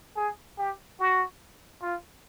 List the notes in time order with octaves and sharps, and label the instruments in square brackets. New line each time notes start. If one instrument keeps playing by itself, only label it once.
[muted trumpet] G#4
G4
F#4
F4